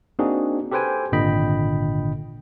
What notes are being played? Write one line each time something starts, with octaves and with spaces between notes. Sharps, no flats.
A#3 C4 D4 D#4 F#4 G#4
G4 A4 B4 C5 G5 G#5
G#1 A#2 D3 D#5 G5 B5